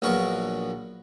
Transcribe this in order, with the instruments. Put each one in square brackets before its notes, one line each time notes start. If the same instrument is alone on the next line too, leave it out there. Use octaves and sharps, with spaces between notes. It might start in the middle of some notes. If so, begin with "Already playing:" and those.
[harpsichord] A#1 F#3 B3 A#4 C#6